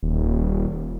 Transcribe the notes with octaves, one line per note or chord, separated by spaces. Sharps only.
D#1